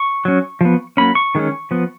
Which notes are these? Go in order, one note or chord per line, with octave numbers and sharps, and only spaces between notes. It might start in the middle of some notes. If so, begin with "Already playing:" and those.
Already playing: C#6
F#3 C#4
F3 B3
F#3 A#3 C#4 B5
C#6
D#3 G#3 C#4
F3 B3